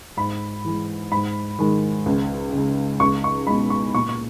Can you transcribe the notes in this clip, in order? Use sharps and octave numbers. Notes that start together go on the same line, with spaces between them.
G#2 B5
E3 G#3
G#2 B5
D#3 G#3
C#2
C#3 G#3
C#2 C#6
C#6
B2 G#3 B5
C#6
A#2 C#6
C#6